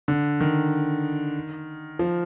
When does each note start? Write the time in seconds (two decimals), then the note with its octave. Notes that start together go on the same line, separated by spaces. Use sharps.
0.08 D3
0.41 D#3
1.99 F3